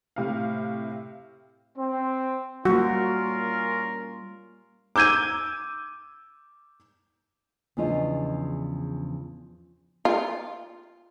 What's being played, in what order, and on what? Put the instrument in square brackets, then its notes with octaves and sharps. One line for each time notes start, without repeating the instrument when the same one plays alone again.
[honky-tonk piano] A2 C3 F5
[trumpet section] C4
[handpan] G3 A#3 [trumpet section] C#4 F4 A#4 [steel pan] F#4
[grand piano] D6 E6 G6 G#6 D#7
[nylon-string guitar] E2 C#3 F3 D4 F4 D#5
[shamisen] F4